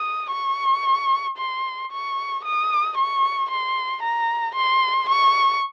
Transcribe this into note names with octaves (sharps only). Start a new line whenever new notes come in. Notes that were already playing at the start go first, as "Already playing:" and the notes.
Already playing: D#6
C#6
C6
C#6
D#6
C#6
C6
A#5
C6
C#6